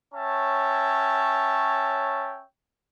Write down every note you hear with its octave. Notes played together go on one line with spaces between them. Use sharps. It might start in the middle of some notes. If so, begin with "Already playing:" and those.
C#4 C#5 E5 G5 A5